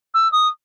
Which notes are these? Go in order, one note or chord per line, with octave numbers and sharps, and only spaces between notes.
E6
D#6